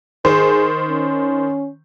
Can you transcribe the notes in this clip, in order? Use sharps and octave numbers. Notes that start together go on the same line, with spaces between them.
D#3 G#4 C5
C#4